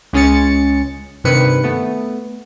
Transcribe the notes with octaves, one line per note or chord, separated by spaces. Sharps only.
C#2 G#3 C#4 G#4 A6 C#7
G2 C3 D#3 B4 C#7
A3 B3